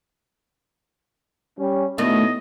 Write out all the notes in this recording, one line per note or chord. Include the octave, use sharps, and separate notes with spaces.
G3 C#4
B2 D#3 A3 B3 D4 E4 D#5